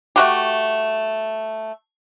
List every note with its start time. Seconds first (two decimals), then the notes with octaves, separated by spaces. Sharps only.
0.16 A3 F#4 G4